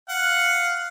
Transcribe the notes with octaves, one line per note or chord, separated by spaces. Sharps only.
F5 F#5